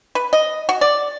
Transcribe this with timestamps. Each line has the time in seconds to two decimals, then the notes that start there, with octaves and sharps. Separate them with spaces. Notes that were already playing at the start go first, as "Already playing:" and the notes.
0.15 B4
0.33 D#5
0.69 F#4
0.81 D5